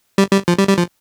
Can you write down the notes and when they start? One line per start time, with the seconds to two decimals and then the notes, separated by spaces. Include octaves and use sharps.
0.18 G3
0.33 G3
0.48 F3
0.58 G3
0.69 G3
0.78 F3